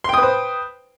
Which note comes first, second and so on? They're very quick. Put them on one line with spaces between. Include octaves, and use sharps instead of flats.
C6 G5 D#6 B4 C5